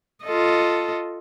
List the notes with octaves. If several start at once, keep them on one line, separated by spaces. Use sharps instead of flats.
F4 A4 D#5